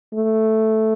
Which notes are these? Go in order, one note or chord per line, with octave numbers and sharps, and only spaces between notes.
A3